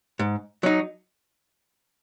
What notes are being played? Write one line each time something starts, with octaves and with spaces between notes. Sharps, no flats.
G#2
F#3 D#4